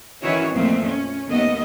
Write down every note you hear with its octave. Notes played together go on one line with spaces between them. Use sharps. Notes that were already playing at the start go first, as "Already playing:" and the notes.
D#3 E3 C#4 E4 F#4 C#5
F2 A#2 F3 A3 C4
C#4
D#2 D#3 A3 B3 D#5